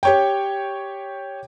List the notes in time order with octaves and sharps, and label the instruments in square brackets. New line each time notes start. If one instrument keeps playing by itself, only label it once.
[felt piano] G4 C#5 G5